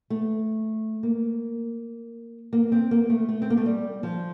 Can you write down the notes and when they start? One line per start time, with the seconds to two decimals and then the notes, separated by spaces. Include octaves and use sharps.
0.10 A3
1.03 A#3
2.53 A#3
2.72 C4
2.91 A#3
3.10 A3
3.29 A3
3.42 C4
3.50 A#3
3.57 A3
3.66 G3
4.03 F3